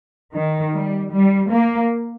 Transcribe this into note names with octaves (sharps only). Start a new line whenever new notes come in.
D#3
G3
G3
A#3